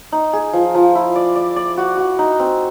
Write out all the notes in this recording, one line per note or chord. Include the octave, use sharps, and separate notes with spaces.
D#4
G#4
F3
F3
E4
D5
D5
D5
F#4
F#4
D#4
C4